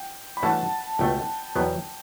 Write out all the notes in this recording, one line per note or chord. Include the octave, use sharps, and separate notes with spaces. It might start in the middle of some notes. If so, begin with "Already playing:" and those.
Already playing: G5
B5
G2 E3 A3 C#4 F#4 F#5 A5
C#2 B2 A3 G5
E2 B2 F#3 B3 G5